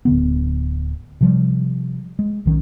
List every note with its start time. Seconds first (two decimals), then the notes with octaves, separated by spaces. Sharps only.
0.05 D1 D3 B3
1.21 C3 F3 G3
2.19 G#3
2.45 B1 D#3 C#4